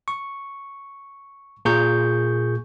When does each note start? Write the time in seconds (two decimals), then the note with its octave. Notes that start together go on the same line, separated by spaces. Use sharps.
0.08 C#6
1.65 A#2 G#4 C#6 G6